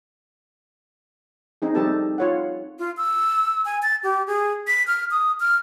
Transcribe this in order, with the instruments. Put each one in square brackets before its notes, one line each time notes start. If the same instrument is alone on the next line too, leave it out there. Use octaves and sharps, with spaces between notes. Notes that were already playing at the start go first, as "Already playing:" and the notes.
[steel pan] C4 D#4 G#4
G3 C4 D#4 G4 A4 A5
F4 C#5 F#5
[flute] F4
E6
G#5
A6
G4
G#4
B6
F6
D#6
F6